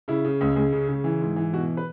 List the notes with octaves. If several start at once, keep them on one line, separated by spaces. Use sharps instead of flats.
C#3 E4
C#3
C#2
C#2 G#4
C#3
C#3
E3
G#2
E3
B2 F#4
B4